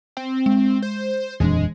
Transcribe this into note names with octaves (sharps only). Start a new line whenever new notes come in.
C4
G#3
C5
D#1 F2 E3 G#3 D4